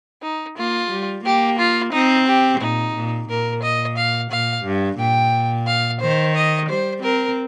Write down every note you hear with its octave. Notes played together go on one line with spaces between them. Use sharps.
D#4
A#3 F4
G3
A#3 G4
F4
C4 D#4
G4
A#2 D#4
A#2
A#2 A#4
D#5
F5
A#2 F5
G2
A#2 G5
F5
D#3 C5
D#5
G3 C5
C4 A#4